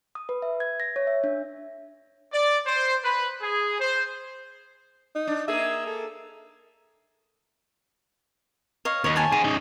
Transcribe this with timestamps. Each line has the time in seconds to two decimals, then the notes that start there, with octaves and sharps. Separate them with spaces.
0.15 D#6
0.29 B4
0.42 E5
0.60 G#6
0.80 A#6
0.96 C#5
1.07 E5
1.24 D4
2.32 D5
2.66 C5
3.04 B4
3.41 G#4
3.80 C5
5.15 D#4
5.27 D4
5.48 A#3 G#4 E5
5.87 A4
8.85 C#5 D#5 F5
9.04 D#2 C#5 D#5
9.16 C#5 G#5 A5
9.32 G#4 C5 G#5
9.44 C#4 D#4